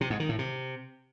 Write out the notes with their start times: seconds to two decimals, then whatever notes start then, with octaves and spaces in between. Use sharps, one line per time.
0.01 C3
0.10 G#2
0.20 D#3
0.29 A2
0.39 C3